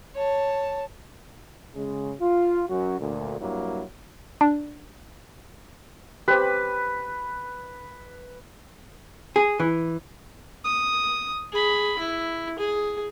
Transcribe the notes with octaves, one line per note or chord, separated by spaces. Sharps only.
C#5 A5
C#3 G#3
F4
F#2 F#4
D2 A#2
G2 F#3 A#3 E4
D4
G4 B4 C5
G#4
E3
D#6
G#4 B5
E4
G#4